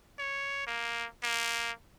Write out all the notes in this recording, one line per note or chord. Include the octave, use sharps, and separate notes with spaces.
C#5
A#3
A#3